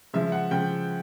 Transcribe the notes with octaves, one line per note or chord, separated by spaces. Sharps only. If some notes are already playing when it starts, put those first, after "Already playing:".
C#3 F3 G#3 E5
F#5
C#3 F3 G#3 G5